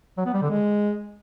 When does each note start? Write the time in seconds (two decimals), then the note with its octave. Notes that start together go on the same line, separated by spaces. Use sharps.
0.18 F#3
0.26 B3
0.34 G3
0.42 D3
0.50 G#3